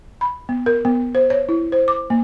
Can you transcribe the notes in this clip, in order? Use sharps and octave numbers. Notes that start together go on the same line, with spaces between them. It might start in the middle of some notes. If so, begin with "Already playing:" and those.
B5
B3
A#4
B3
C5
C#5
E4
C5
D6
A#3